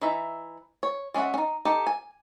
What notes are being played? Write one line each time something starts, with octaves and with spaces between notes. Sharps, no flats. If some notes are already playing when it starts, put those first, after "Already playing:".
E3 D#4 E5
C#5
G#3 C#4 D4 E5 F#5
C#4 D#4
D#4 G4 A4
G#5